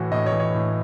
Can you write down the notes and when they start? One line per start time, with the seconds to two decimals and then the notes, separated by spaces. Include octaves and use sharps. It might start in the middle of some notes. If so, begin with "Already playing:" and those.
Already playing: A2 E3 F#4
0.12 A2 D#5
0.26 C#5
0.32 E3
0.40 C#5
0.54 A2